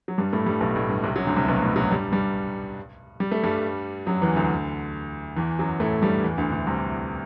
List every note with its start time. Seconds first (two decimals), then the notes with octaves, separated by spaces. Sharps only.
0.08 F#3
0.18 G2 G3
0.33 A2 A3
0.46 G2 G3
0.61 B1 B2
0.76 A2
0.89 G2
1.04 C2 C3
1.16 F#2 F#3
1.26 D2 D3
1.36 C2 C3
1.48 B1 B2
1.62 A2
1.76 F#2 F#3
1.91 G2 G3
2.12 G2 G3
3.20 G3
3.32 A3
3.43 G2 G3
4.07 F#2 F#3
4.22 E2 E3
4.35 D2 D3
5.36 E2 E3
5.59 F#2 F#3
5.80 A2 A3
6.02 G2 G3
6.23 E2 E3
6.38 D2 D3
6.52 D2 D3
6.67 C2 C3